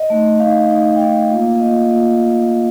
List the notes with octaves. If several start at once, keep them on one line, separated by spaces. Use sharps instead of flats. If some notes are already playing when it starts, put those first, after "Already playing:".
Already playing: D#5
A3 D#4
A3 D#4 F5
A3 D#4
G5
A3 D#4 F5
A#3 F4
A#3 F4 D#5
A#3 F4